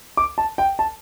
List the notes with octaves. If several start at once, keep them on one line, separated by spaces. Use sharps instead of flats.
D6
A5
G5
A5